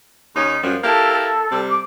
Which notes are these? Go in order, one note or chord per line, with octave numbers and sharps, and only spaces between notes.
D#2 C#4 D#4
F#2 F3 G3
A#3 E4 G4 A4
A4
C3 G3
D6